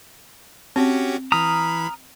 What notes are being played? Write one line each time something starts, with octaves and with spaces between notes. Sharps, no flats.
C4 C#4 F#4 G4
E3 A#5 B5 D#6 F6